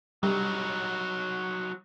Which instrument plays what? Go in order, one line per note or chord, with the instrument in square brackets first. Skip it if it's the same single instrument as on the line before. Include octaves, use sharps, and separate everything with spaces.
[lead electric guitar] F#3 D#4 [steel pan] G3